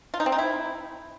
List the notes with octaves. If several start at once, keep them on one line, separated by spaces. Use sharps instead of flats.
F4
D#4
C4
D#4
E4